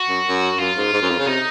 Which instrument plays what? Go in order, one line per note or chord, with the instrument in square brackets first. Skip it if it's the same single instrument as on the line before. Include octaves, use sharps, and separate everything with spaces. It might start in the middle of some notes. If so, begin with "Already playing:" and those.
Already playing: [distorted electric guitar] F#4
[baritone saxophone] F#2
F#2
[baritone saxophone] F#2 [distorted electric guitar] F4
[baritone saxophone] G#2
G#2
F#2
F2
C#3
[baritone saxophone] C3 [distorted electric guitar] D#4